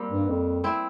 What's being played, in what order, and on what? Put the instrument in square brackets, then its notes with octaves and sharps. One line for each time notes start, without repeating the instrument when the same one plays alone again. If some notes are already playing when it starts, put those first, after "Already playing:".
Already playing: [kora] G3 A#3 C4
[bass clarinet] G2
F2
[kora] C4 E4